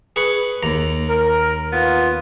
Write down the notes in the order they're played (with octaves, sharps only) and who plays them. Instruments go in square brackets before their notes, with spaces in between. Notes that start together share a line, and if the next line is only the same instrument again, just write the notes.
[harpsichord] G#4 B4 C#6
D#2 A#5
[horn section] A#4
B3 F4